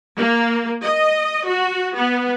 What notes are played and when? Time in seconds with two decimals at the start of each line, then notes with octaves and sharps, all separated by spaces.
0.18 A#3
0.83 D#5
1.48 F#4
1.96 B3